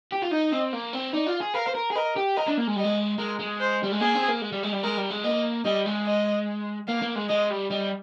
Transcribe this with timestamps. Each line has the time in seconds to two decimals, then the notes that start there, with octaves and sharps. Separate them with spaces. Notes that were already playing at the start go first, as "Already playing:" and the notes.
0.12 G4
0.22 F4
0.31 D#4 D#5
0.52 C4
0.73 A#3
0.93 C4
1.13 D#4 D5
1.27 F4
1.41 G#4
1.54 A#4 F5
1.68 C5
1.75 A#4
1.90 G#4
1.96 A#4 D#5
2.16 G4
2.37 A#4 D#5
2.47 D4
2.57 A#3
2.67 G#3
2.76 G3 D#5
2.85 G#3
3.19 G#3 A#4
3.40 G#3
3.60 C5
3.84 G3
3.92 G#3
4.01 A#3 G#4
4.15 C4
4.29 A#3
4.42 G#3
4.52 G3
4.63 G#3
4.72 G3
4.83 G#3 A#4
4.97 G3
5.11 G#3
5.24 A#3 D#5
5.65 G3 D#5
5.86 G#3
6.07 D#5
6.88 A#3 F5
7.02 A#3
7.16 G#3
7.29 G#3 D#5
7.50 G3
7.70 G3 D#5